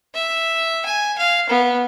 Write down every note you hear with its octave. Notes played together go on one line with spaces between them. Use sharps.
E5
G#5
F5
B3